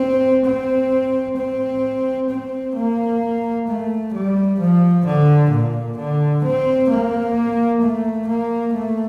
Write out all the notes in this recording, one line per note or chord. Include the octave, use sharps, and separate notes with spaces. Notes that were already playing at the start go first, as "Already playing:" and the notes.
Already playing: C4
C4
C4
C4
A#3
A3
G3
F3
D3
A#2
D3
C4
A#3
A3
A#3
A3